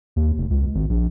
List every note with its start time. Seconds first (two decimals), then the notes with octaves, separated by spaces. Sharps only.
0.16 D#2
0.38 F1
0.50 C#2
0.75 G#1
0.89 A#1